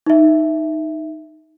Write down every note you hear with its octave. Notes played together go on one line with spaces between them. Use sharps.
D#4 E5